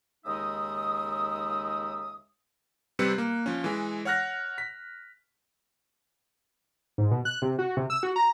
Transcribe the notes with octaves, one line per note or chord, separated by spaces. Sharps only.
D#2 C#3 G#3 D#4 E5 D#6
C3 G3 C4 B4 F#6 C#7
A#3
F3 C#4
E3 G#3
C#5 F#5 F6 F#6 A#6
B6
G#2
B2
F#6
C3
F#4
C3
E6
F#4
A#5